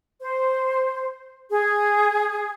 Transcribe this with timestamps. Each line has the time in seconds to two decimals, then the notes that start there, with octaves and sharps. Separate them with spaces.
0.21 C5
1.51 G#4